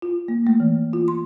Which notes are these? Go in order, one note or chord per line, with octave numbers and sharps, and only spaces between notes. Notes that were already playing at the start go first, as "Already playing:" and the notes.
F4
A#3
A3
E3
F4
C6